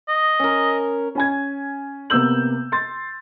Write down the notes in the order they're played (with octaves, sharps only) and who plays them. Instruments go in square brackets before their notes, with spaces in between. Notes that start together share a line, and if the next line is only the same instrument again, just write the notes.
[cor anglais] D#5
[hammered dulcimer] C#4 A#4
[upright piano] C#4 G#5 G#6
C3 A#3 B3 E6 G6 F#7
C6 A6